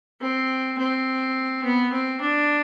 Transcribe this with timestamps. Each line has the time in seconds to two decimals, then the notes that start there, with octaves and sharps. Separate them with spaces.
0.21 C4
0.78 C4
1.64 B3
1.92 C4
2.21 D4